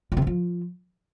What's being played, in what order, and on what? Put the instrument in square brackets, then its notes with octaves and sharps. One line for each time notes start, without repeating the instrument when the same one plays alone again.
[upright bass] A2
C3
G#2
F3